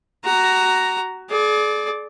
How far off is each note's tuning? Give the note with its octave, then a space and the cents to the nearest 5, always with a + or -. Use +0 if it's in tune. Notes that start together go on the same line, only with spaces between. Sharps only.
F#4 +15 A#5 +0
G#4 +40 D5 +0